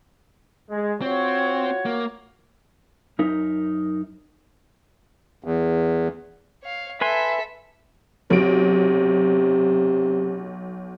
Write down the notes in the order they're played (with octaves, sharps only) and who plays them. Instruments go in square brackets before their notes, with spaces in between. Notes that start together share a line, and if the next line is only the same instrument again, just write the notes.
[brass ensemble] G#3
[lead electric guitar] C4 [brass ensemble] F4 F#4 C#5
[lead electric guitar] A#3
[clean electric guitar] F#2 D#4 A#4 E5
[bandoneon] E2
[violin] C#5 F5
[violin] A4 B6 [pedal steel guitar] B4 G#5 C6 [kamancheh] E5
[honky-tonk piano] B1 D7 [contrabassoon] C3